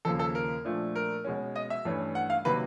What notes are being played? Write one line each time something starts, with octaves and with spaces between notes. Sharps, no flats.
D#2 C#3 F3 A#3 A4
A4
A#4
A#2 F3 A3 D4
A#4
B2 G#3 C#4
D#5
E5
G2 E3 A3 C#4
F#5
F5
C3 D#3 F#3 A#3 B4